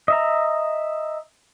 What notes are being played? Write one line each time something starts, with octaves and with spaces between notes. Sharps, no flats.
D#5 E5 A#5